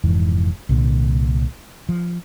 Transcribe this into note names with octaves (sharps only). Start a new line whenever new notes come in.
F1 F2 G#2 E3
C2 A#2 D3
F3